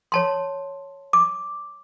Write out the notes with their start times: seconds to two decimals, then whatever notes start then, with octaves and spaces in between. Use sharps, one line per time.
0.12 C#5 A5 C6
1.13 D6